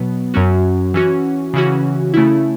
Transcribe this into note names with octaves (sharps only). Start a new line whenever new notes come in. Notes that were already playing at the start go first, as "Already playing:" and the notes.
Already playing: B2 F#3 B3
F#2 F#3 C#4 F#4
E3 C#4 F#4
C#3 E3 C#4 F#4
C#3 A3 C#4 E4